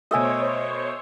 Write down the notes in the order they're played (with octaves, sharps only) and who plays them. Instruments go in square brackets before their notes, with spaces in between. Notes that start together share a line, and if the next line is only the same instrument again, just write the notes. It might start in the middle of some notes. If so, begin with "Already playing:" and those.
[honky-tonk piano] B2 A3 [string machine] C5 C#5 [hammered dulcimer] D#5 E5 G#5